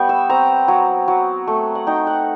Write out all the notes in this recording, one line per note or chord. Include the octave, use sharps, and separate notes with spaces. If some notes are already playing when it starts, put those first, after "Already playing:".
Already playing: G3 B3 G5 C#6
E6
C4 A#5
F#3
F#3
A3
F#5
D#4 G5
F#5